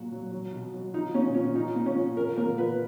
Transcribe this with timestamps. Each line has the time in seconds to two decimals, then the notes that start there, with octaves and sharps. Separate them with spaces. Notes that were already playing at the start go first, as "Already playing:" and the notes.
Already playing: A#2 F#3 F#4
0.12 F#3
0.32 F#3
0.53 B2
0.74 F#3
0.93 F3 D#4
1.14 A#2 C#4
1.34 F3 C#4
1.55 F3 D#4
1.76 A#2
1.86 C#4
1.95 F3
2.16 F3 A#4
2.36 A#2 A#4
2.58 F3 B4